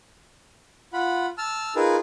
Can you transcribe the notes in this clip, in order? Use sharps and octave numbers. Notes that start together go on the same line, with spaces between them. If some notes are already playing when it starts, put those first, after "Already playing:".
F4 F#5 B5
A5 E6 F6
D#4 F4 G#4 A#4 B4